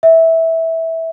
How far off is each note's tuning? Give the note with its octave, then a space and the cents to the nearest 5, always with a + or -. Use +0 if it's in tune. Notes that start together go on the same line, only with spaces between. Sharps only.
E5 -15